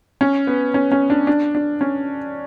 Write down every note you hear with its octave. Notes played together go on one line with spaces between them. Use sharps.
C#4
B3
C#4
C#4
D4
D4
D4
C#4